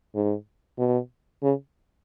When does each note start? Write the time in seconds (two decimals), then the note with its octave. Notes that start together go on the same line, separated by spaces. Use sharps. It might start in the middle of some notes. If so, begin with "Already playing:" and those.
0.15 G#2
0.79 B2
1.43 C#3